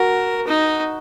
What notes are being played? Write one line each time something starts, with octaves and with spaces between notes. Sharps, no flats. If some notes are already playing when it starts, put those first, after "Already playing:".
Already playing: F#4 A#4
D#4